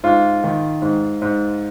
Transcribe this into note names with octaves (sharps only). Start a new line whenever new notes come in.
G#2 F4
D#3
G#2
G#2